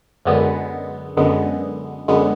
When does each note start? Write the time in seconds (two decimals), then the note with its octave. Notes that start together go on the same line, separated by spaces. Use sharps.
0.25 F#2 D3 G#3 B3
1.17 F#2 D3 G#3 B3
2.08 F#2 D3 G#3 B3